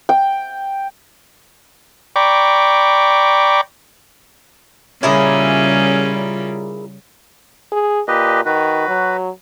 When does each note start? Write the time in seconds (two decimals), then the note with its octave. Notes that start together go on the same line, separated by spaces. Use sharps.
0.09 G5
2.16 D5 G5 A#5 B5 C#6 D6
5.03 A#2 C#3 G3 C#4 E4 G#4
7.72 G#4
8.08 A#2 G4 B4 D#5
8.46 D#3 F#4 B4
8.88 F#3